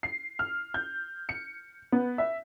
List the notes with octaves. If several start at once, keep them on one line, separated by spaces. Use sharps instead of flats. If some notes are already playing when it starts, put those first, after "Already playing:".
C7
F6
G6
C#7
B3
E5